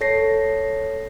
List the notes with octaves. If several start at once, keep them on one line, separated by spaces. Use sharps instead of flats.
A4 C#5 A#6 C7